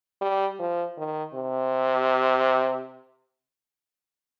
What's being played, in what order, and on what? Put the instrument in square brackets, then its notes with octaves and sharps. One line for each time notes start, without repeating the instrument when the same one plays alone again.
[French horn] G3
F3
D#3
C3